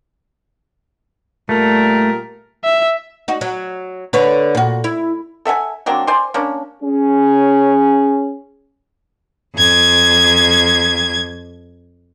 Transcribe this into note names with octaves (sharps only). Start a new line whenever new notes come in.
A#2 G3 A3 A#4
E5
D#4 F#4
F#3
D3 B4 C#5
A#2 F#4
E4
A4 E5 F#5 G#5
F#3 A#3 C4 D4
C5 D5 G#5 C6
A#3 C#4 D4
C#4 G#4
F2 G#6